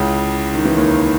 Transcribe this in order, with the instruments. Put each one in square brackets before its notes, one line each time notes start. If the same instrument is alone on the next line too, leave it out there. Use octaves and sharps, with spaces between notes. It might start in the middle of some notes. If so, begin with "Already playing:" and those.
Already playing: [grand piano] C#2 C#3 [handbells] E4
[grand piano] D#3
E3
D#2 D#3